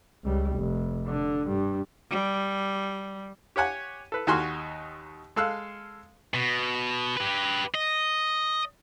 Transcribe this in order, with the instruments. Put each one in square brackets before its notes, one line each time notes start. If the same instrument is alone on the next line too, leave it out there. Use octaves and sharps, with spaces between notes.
[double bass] C#2 G3
F1
D3
G2
[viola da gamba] G3
[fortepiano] G4 C#5 F#5 G#5
A4 B4
D#2 D#4 F#4 G#5 C6 F6
G#3 A4 F5 E6 F#6
[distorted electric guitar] B2
G4 B4
D#5